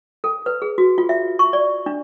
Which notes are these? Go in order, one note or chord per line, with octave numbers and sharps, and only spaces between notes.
A4
B4
G#4
F#4
F4
E5
C#6
D5
D4